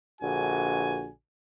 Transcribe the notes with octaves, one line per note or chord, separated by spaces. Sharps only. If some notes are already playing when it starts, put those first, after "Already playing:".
A#1 D3 F#4 G#5